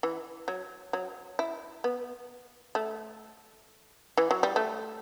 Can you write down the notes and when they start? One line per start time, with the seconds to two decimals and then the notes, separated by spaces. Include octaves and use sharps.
0.03 E3
0.48 F#3
0.93 F#3
1.39 E4
1.84 B3
2.75 A3
4.17 E3
4.31 F#3
4.43 G3
4.56 A3